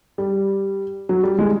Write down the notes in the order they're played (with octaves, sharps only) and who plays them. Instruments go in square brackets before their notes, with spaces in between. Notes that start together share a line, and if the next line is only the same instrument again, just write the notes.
[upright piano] G3
F#3
G3
G#3